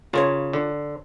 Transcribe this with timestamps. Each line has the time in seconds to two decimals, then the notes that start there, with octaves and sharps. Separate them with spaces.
0.13 C#3 F4 A#4 C#5
0.53 D3